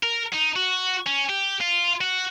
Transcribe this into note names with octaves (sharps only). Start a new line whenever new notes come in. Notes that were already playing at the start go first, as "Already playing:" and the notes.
A#4
D#4
F#4
C#4
G4
F4
F#4